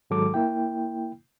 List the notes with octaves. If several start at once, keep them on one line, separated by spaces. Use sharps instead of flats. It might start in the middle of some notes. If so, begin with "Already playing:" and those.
G#2 D#3 F#3 G#3 A4 D6
A#3 E4 G5